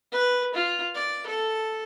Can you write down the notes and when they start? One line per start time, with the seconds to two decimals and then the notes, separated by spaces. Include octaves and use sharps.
0.12 B4
0.54 F4
0.94 D5
1.26 A4